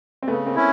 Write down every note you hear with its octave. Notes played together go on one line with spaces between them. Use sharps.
C4
C#3 A3 B3
A#3 C4
C#4 E4